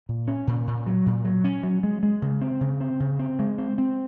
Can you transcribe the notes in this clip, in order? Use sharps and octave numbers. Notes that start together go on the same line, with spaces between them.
A#2
C#4
A#2
A#2
F#3
A#2
F#3
C#4
F#3
G#3
G#3
C#3
C4
C#3
C4
C#3
C4
G#3
C4
C4